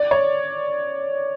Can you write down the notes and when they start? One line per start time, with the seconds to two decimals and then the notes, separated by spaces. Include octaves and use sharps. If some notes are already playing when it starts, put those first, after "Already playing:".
Already playing: D5
0.11 C#5